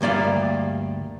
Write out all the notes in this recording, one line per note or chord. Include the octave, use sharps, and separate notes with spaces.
D2 G2 A#3 D5 F5